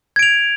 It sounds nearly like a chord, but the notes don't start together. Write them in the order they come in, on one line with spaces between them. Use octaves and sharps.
G#6 D7 F7